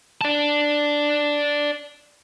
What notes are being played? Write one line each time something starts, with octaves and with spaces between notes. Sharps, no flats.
D5 A5